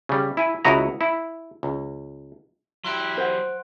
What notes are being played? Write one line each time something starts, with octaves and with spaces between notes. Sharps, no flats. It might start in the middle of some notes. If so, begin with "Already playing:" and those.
C#3 G3
E4 G#5
C#2 E4 F#4 D#5 A#5
E4
C#2
F#3 E4 G4 C6 F#6 D7
C5 F#5